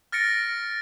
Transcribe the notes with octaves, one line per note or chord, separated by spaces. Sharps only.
F6 A6 A#6 C#7 D7